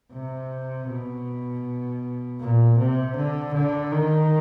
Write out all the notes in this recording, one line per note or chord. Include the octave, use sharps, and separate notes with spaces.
C3
B2
A#2
C3
D3
D3
D#3